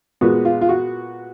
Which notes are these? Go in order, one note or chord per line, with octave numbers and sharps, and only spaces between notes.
A#2 G#3 B3 F#4
F4
F4
F#4